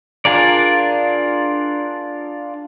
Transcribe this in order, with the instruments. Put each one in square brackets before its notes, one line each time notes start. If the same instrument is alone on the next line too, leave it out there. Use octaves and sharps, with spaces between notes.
[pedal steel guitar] D4 F4 G#4 A#4 D5